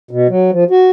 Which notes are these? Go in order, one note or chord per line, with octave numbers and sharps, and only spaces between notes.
B2
F#3
F3
F#4